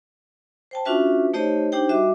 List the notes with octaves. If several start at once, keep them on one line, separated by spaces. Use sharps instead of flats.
C5 G5 A5
C#4 D4 F4 F#4 B4 E5
A3 D#4 G4 C5 C#5 D#5
D4 D#4 G4 C5 G5
G3 F#4 D#5 E5 D6